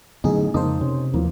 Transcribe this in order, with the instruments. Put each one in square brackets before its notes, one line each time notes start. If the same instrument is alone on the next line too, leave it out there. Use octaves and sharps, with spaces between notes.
[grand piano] A1 [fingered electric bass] D3 F#3 B3 [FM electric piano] D#4 G#4
[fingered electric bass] F2 C#3 G#3 [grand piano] A#3 A5 D#6 [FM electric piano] D#4 C5
[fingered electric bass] C3 [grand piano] C#4
[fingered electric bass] D#2 F3 [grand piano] E3 A#3